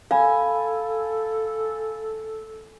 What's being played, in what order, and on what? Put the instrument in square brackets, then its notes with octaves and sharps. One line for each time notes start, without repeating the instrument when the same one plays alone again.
[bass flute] A4 [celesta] F5 B5 [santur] G#5